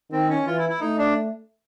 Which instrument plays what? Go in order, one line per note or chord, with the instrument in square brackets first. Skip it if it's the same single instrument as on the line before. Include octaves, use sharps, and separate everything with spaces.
[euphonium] D#3 [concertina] C4
[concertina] C#4
[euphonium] E3 [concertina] F4
[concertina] E4
E4
[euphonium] A3 [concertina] D#4
[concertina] D4